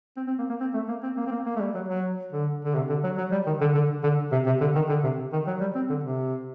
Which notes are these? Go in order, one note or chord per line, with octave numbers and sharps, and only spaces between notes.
C4
C4
A#3
A#3
C4
A3
A#3
C4
A#3
C4
A#3
A#3
A3
G3
F#3
F#3
D3
D3
C3
D3
F#3
F#3
G3
D#3
D3
D3
D3
C3
C3
D3
D#3
D3
C3
D#3
F#3
G3
C4
D3
C3